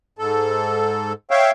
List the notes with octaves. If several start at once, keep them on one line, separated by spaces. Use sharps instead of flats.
G#2 A4
C#5 E5 F5 G5